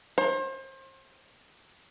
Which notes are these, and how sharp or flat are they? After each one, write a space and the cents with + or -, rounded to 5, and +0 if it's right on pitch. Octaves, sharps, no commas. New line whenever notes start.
C5 +35